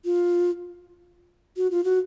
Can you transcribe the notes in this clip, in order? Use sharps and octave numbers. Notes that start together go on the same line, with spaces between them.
F4
F#4
F4
F#4